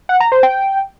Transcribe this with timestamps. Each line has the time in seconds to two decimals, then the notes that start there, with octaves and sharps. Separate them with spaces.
0.09 F#5
0.20 A#5
0.32 C5
0.43 G5